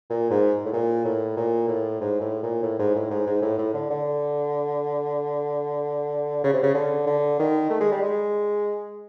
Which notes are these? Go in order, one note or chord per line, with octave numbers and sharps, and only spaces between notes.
A#2
G#2
A2
A#2
A2
A#2
A2
G#2
A2
A#2
A2
G#2
A2
G#2
G#2
A2
A2
D3
D3
C#3
C3
C#3
D3
D3
D#3
A3
G#3
G3
G#3